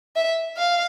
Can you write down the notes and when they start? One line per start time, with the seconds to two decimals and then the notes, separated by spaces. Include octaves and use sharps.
0.16 E5
0.57 F5